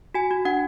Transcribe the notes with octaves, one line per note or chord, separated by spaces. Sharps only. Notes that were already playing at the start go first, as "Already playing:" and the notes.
F#4 G#5
F#4
D4 F#5